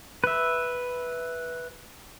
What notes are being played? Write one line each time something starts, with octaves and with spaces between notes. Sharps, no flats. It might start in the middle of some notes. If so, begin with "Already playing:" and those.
B4 E5